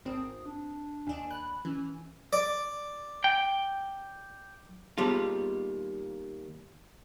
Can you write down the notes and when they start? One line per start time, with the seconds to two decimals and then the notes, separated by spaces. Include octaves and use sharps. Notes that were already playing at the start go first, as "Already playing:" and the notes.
0.05 G#1 C4 D#6
0.46 D4
1.07 D#2 D4 G#5
1.31 B5 F#6
1.65 E3 C#4
2.33 D5
3.24 G5
4.98 D#2 G3 B3 F4 G#4